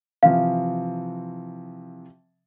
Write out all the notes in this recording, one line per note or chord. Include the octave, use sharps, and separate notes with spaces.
C3 E3 F3 F5